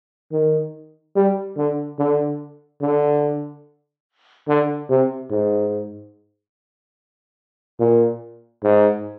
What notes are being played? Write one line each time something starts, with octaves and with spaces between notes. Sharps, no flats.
D#3
G3
D3
D3
D3
D3
C3
G#2
A#2
G#2